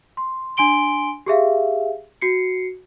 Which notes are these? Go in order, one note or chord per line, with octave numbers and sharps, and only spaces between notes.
C6
D4 G#5 C6 D7 G7
G4 G#4 E5 F5
F#4 C7 C#7